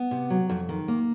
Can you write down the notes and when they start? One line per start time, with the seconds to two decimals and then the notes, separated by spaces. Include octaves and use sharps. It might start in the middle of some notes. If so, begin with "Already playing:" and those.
Already playing: B3
0.11 C3
0.30 F#3
0.49 F2
0.69 D#3
0.88 A#3